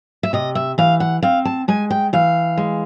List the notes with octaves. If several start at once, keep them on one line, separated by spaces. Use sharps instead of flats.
E5
C3 D#5
E5
E3 F5
F#5
C4 F5
A5
G#3 G#5
G5
E3 F5
G#3